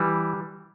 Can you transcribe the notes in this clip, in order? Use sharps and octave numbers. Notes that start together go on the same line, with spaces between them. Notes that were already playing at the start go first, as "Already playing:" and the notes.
Already playing: E3 G3